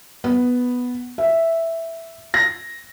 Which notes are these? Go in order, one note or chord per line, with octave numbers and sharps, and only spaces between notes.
B3
E5
A#6